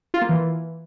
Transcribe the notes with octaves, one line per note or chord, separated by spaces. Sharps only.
F4
A#3
E3